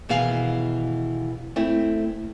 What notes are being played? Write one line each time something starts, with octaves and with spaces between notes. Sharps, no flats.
D#2 B2 E3 G#4 F5
A3 C4 E4